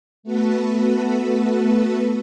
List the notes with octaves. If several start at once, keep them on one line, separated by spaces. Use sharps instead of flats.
A3 B3 F#4 A4 B4